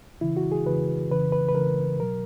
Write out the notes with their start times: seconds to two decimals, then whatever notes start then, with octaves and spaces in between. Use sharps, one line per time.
0.21 C#3 E3 E4
0.37 F#4
0.52 G#4
0.66 C#3 E3 B4
1.11 C#3 E3 B4
1.32 B4
1.49 B4
1.55 C#3 E3 A#4
2.00 B2 F#3 A#4